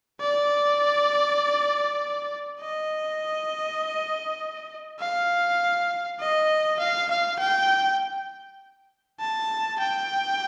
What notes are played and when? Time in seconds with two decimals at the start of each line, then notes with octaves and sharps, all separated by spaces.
0.20 D5
2.61 D#5
5.00 F5
6.20 D#5
6.79 F5
7.10 F5
7.39 G5
9.20 A5
9.79 G5